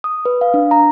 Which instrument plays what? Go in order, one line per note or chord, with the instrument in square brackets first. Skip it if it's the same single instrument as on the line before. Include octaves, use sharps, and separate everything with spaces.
[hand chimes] D#6
B4
F5
D4
A#5